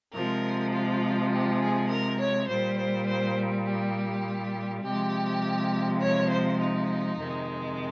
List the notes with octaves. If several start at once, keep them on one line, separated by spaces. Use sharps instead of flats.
C3 F3 G#3 A#4
F4
G4
G#4
A#4
C#5
A#2 G3 C5
C5
C5
G4
C3 F3 G#3 G4
C#5
C5
D#4
F2 C3 D#3 G#3